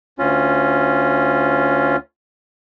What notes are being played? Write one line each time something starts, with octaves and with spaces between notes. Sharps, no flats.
D2 C#4 F4